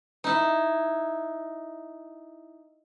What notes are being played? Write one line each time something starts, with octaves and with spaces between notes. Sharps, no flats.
D#4 E4